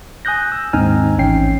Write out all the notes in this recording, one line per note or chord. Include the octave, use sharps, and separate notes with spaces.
G#5 D#6 F#6 G6 A#6
E6
D#2 G#2 C4 D#4 G#5 F6
A1 C#4 G5 C7